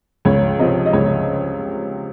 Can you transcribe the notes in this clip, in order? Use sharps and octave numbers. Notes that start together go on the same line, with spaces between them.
C#2 C#5
C3 F3 D#5
D#5
C#2 C#5